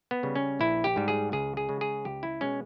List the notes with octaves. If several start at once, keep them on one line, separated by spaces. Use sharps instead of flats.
B3
C#3 G3
C#4
A#1 E4
G4
G#2 G3
G#4
C#2 G#4
G#4
C#3 G#3
G#4
C#2 G4
E4
B2 G#3 C#4